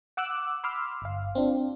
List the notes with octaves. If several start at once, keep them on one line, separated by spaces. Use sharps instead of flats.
F#5 D6 E6 F#6
B5 C6 D6 E6 F6
G1 F5
C4 D4 F4